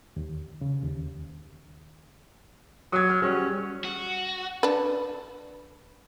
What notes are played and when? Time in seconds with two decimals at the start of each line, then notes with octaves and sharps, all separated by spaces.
0.16 D#2
0.61 C#3
0.84 D#2
2.92 F#3 D#6 G#6
3.09 F6
3.22 G3 C#4 F#4 G#4
3.85 F#4
4.63 D4 B4